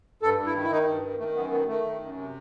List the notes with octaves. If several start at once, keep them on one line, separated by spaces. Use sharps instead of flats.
G2 A4
G2
E4
D#3
E4
D#3 D#4
G2
D#3
D#3 A3
F#2 B3
D#3 B3
D#3 A3
D#3
F#2
C3